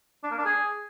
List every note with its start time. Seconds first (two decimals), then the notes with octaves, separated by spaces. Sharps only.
0.23 D4
0.31 A#3
0.38 D4
0.45 G#4